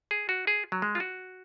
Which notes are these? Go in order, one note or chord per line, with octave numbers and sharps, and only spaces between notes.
G#4
F#4
G#4
F#3
G#3
F4
F#4